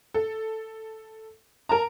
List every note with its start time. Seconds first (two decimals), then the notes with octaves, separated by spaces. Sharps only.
0.14 A4
1.69 A#4 A5 A#5